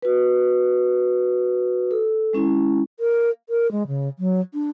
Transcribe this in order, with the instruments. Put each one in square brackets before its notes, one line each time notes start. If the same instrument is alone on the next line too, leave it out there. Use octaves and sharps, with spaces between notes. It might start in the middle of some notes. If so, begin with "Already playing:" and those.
[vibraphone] F#4 B4
A4
G#3 C#4 E4
[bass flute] A#4
A#4
G#3
C#3
F#3
D4